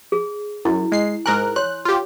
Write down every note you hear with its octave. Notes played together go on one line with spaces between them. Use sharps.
G#4
F#2 E4
G#3 C7
G#2 A#4 G#5 F#6
C#5 C6 F#6
F4 G4